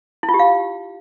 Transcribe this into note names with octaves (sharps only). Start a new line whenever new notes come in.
E4
F4
G4
F5